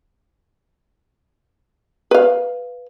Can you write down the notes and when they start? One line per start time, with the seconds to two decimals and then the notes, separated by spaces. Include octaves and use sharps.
2.11 B4 F5